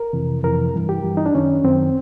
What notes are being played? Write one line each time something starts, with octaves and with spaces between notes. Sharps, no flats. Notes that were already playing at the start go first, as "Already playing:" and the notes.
Already playing: A#4
F2 C3 E3
F2 C3 E3 A#4
G2 E3
G4
G2 E3
D#4
D4
F#2 D#3 C#4
F#2 D#3 C4